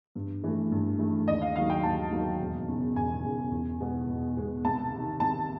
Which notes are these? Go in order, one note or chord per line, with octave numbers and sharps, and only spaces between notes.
G2
E3 A3
G2
E3 A3
D#2 D#5
F5
D#3 F#3 A#3 F5
G5
D#2 A5
D#3 F#3 A#3
E1
E2 C#3
E1 G#5
E2 C#3
E2
B2 G#3 B3
E2
B2 G#3 B3
C2 A5
C3 D#3
C2 A5